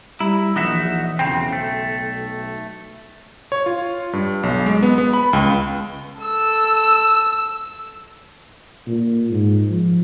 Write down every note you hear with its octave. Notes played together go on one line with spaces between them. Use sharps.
G3 E4 A#5
A#1 E3 D#4 F#4 E5
B1 E2 C#3 C4 G5
A3
C#5
F4
G2
B1
G#3
B3
B3
B5
C#2
A4 E6
A#2
G#2
F3